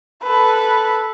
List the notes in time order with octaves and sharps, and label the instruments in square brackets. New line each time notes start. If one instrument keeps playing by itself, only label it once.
[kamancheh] A4 B4